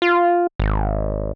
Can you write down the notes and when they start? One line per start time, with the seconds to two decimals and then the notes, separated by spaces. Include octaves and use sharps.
0.02 F4
0.60 G#1